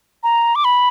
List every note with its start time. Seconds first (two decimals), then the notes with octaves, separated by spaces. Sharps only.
0.23 A#5
0.55 D6
0.65 B5